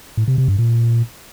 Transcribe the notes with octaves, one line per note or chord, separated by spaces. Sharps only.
A2
C3
C3
G2
A#2